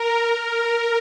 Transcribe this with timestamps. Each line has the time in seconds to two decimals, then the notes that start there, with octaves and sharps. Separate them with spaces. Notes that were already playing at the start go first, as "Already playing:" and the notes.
Already playing: A#4
0.40 A#4